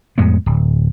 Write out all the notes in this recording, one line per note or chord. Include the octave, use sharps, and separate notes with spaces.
F2 A2 G#3 B3
D1